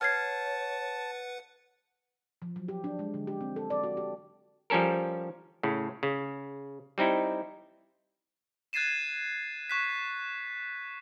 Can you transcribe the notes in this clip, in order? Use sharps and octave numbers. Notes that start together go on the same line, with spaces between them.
B4 C#5 F#5 A5 F6 G#6 C7
F3
F#3
G4
D4
G#3
D3
G4
C4
A4
D5
F#4
G4
F3 G3 C#4 A4 A#4
A2 C#3
C#3
G3 C4 D#4 E4
F#6 G#6 A6 C7 D#7 E7
C#6 F#6 B6